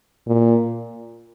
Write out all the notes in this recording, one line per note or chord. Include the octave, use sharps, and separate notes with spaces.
A#2